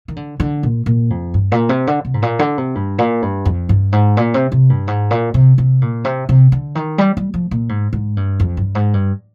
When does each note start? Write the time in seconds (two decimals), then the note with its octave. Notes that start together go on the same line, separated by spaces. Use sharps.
0.08 D#3
0.16 D3
0.40 D3
0.63 A#2
0.86 A#2
1.10 F2
1.34 G2
1.52 A#2
1.69 C3
1.87 D3
2.05 C3
2.14 G#2
2.22 A#2
2.39 D3
2.58 C3
2.75 G2
2.98 A#2
3.22 G2
3.45 F2
3.69 G2
3.92 G#2
4.17 A#2
4.34 C3
4.52 C3
4.70 G2
4.88 G#2
5.11 A#2
5.34 C3
5.58 C3
5.82 A#2
6.05 C3
6.29 C3
6.52 D3
6.75 D#3
6.98 G3
7.17 G3
7.34 F3
7.51 A#2
7.69 G#2
7.93 G#2
8.17 G2
8.40 F2
8.57 G2
8.75 G#2
8.94 G2